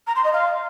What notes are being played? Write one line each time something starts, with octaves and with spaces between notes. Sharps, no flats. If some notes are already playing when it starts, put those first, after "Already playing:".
A#5
C6
D#5
F5